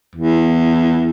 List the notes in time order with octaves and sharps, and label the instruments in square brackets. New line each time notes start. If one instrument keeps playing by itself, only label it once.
[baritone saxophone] E2